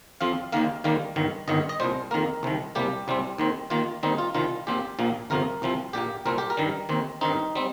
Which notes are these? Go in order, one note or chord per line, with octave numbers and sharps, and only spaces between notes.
F2 F3 C4 F5
D#2 D#3 A#3 F5
D#2 D#3 G3 A#3 F5
G1 G2 D#3
G1 G2 D#3 D#5
D#5
C2 A#2 G3 C5
F2 D#3 A#3 A#4
C2 C3 D#3
C2 C3 G3 A#3 G4
C2 C3 G3 C4
D#2 D#3 C4
D#2 D#3 A#3 F4
D#2 D#3 G3 C4 D#4
F4
C2 C3 D#3 G3 F4
A#1 A#2 F3 C4 G4
A#1 A#2 F3 A#3
G1 F2 C3 F3 A#4
C2 C3 F3 C4
A#1 A#2 A#3 G4
C2 A#2 G3 C4 A#4
G4
A#4
G2 D#3 G3
D#2 D#3 C4
G2 D#3 C4 D#4
G3 C4